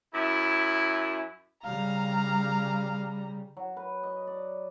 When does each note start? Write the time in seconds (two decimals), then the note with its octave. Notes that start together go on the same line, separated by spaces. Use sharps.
0.14 F#2 E4
1.65 C#3 G3 F5 A#5
3.57 F#3
3.77 B4
4.03 D#5
4.27 D5